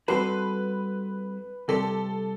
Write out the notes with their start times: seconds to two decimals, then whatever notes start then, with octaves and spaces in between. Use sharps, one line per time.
0.08 G3 C4 F#4 A4 B4 C5
1.68 C3 G3 C4 G4 A4